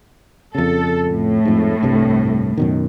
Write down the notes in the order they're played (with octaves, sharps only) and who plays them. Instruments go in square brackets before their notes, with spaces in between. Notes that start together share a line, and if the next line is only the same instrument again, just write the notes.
[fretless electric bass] F2 C#3 [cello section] A4
[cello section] A2
[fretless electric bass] F2 G#2
C2 G2 C3
F#2 B2 D#3